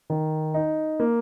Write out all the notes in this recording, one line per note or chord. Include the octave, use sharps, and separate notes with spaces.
D#3
D#4
A#3